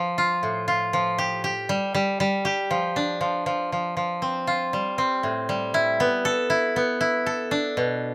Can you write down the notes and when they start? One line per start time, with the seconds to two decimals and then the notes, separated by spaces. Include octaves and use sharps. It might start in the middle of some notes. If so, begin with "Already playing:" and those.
Already playing: F3
0.18 F4
0.43 A2
0.68 F4
0.93 F3
1.18 G4
1.44 G4
1.69 G3
1.95 G3
2.20 G3
2.45 G4
2.71 F3
2.96 D4
3.21 F3
3.46 F3
3.72 F3
3.97 F3
4.22 C4
4.47 F4
4.73 G3
4.98 C4
5.23 A2
5.49 G3
5.74 E4
6.00 B3
6.25 A4
6.50 E4
6.76 B3
7.01 E4
7.26 A4
7.51 D4
7.77 B2